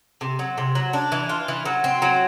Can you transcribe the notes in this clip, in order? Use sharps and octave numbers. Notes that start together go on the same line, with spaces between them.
C3
F#3
C3
F#3
D4
E3
F4
E3
F#3
C4
F#3